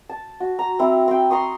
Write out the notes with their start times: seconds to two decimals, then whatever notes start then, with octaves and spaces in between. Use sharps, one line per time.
0.09 A5
0.40 F#4
0.59 A#5
0.79 C4 E4
1.08 C4 G5
1.30 A#5 C6 C#6 D#6